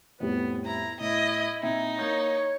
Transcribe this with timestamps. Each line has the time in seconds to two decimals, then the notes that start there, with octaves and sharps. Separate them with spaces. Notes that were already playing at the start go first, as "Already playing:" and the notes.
0.20 F2 A2 G3 B3
0.65 E4 A#5
1.00 A2 E4 D#5
1.63 A#2 C4 D#4 E5
1.99 A#3 C#5 G6